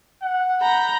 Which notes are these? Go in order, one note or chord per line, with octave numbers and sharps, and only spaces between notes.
F#5
A#5 B5 G6